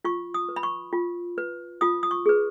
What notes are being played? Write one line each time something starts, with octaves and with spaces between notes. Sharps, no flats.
F4 C#6
D#6
B4
B5
C#6
F4
B4
F4 D#6
D#6
C#6
G#4 B4